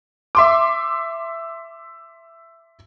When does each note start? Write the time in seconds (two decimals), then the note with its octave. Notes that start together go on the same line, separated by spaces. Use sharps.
0.35 E5 C6 D6